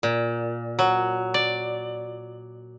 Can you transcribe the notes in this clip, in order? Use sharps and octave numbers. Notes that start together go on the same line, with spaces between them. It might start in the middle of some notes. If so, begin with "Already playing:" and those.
A#2
F#3
D5